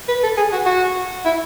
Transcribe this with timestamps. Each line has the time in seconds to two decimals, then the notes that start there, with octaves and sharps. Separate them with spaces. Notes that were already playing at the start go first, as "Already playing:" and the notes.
0.08 B4
0.23 A4
0.37 G#4
0.53 F#4
0.66 F#4
1.25 E4